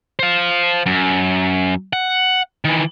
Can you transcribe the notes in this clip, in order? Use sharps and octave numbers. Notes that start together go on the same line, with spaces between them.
C5 F5
F#2
F#5
D#3 E3